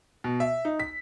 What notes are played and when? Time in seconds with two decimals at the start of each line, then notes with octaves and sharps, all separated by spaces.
0.24 B2
0.40 E5
0.65 D#4
0.80 B6